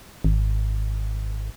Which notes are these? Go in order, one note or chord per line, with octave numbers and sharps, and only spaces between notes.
G#1